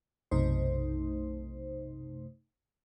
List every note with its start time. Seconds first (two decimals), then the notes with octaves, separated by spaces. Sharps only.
0.31 B1 F#2 C3 A3 D#4 C5